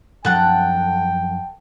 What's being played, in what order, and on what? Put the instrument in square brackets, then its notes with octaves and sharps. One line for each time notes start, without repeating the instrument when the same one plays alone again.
[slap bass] F#2 F3 D4 [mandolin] A4 F#5 A#5 [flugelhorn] G5